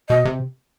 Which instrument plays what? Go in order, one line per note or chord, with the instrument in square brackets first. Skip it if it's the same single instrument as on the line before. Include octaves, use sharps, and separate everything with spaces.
[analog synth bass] B2 [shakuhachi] D#5
[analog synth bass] C3